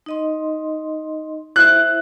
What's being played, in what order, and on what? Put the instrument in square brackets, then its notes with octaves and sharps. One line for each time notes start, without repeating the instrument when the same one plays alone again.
[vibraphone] D#4 D#5 C6
[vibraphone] E4 C5 E5 [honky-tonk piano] F#6